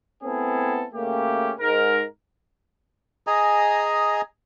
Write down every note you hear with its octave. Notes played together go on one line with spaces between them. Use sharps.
A3 B3 C4 E4 G#4 A4
C#3 A3 A#3 C#4 G4
G#2 A#4
G#4 D#5 G#5 A#5